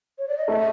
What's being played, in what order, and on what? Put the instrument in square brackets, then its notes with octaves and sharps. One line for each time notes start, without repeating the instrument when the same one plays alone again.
[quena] C#5
D5
D#5
[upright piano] A3 [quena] E5